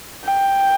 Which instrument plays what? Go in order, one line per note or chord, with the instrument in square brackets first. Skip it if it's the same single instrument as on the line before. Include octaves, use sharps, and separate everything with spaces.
[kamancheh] G5